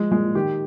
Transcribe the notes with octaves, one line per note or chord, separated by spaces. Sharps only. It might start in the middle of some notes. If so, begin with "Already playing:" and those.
Already playing: F3 G#3
A#2 G#3
D#3 G4